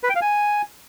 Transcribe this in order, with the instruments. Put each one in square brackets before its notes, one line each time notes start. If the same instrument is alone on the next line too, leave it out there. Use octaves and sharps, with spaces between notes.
[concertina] B4
G5
F5
G#5